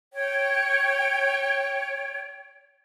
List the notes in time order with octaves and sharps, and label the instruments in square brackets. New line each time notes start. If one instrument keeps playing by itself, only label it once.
[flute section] C#5 G5